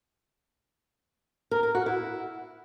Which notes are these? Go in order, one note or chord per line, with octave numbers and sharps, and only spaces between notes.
A#4
A#4
F#4
E4